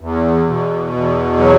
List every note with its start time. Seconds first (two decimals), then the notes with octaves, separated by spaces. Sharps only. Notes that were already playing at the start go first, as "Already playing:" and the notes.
0.01 E2
0.47 B2
0.93 E2
1.39 F#3